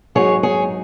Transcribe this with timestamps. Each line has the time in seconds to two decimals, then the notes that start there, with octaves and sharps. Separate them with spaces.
0.15 G#2 F#3 D#4 G#4 C#5
0.43 G#4 C#5